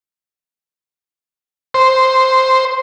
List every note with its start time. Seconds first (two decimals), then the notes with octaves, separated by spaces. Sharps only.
1.74 C5